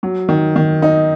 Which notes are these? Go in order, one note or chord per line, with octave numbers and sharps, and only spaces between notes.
F#3
D#3
D#3
D#4